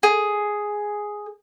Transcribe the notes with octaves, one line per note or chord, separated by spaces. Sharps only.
G#4